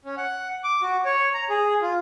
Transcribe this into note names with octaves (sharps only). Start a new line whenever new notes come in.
C#4
F#5
D6
F#4
C#5
A#5
G#4
F4